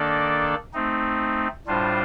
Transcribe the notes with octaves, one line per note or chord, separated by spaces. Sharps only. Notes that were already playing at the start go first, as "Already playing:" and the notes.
Already playing: D#3 A#3 D4 A4 D5
A3 C4 D#4
A2 G3 D4 F4 C5